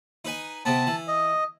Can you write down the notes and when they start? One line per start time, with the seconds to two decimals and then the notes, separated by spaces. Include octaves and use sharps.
0.25 D#4 B4 G#5
0.65 C3 B3 A5
0.87 E3
1.08 D#5